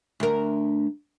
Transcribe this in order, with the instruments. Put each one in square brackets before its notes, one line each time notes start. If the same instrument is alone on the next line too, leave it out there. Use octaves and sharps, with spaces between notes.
[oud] D2 A#4